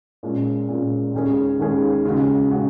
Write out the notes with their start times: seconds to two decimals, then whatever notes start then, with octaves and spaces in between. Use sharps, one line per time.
0.23 A#2 G#3 C#4
0.69 A#2 G#3 C#4
1.14 D#2 D#3 G#3 C#4 G#4
1.59 D#2 D#3 G#3 C#4 G#4
2.04 D#2 C#3 G#3 F#4
2.50 C#3 G#3 F#4